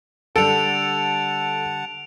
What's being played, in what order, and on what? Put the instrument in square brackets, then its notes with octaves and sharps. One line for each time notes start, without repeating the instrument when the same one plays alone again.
[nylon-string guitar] D3 G3 D4 [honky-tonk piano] A4 [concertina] F#5 A5 [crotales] D7 F7